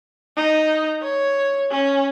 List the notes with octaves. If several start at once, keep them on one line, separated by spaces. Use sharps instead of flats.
D#4
C#5
C#4